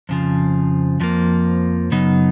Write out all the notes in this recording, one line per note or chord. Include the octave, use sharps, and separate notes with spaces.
F2 C#3 F3
F2 F3 A#3
F#2 C#3 F#3 B3 D#4